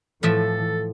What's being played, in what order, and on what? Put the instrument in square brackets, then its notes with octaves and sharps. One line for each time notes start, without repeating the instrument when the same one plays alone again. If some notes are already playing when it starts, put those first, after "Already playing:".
[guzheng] A2 F3 E5 [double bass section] E3 [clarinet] A4